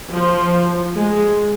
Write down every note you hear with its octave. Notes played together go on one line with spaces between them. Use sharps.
F3
G#3